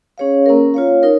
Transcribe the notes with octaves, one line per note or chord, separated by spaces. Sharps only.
C#4 G#4 C#5 F5
A#3 C#4 A#4
F4 C#5 F5
D#4 A#4 C#5